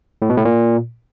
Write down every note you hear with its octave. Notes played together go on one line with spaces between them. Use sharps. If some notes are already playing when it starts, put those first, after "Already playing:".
A2
B2
A2
A#2